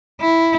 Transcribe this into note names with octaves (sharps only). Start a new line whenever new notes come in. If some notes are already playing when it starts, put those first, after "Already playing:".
E4